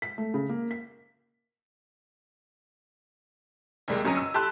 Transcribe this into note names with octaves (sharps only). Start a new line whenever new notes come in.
B6
A3
C#3
A#3
B6
D#2 C3 G3 G#3 A#3
G1 F#2 C#4 D#5 A#5 D#7
E6
G4 A4 A5 B5 C6 F#6